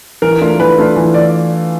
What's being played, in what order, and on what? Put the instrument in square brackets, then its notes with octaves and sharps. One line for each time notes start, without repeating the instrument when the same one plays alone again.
[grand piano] E3 [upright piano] A#4
[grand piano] A3 D4 F4
[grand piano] E3 [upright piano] B4
[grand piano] A3 D4 F4
E3
[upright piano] D5